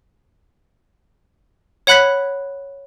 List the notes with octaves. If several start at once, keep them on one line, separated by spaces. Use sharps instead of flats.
C#5 F#5 B5 F#6 G#6 B6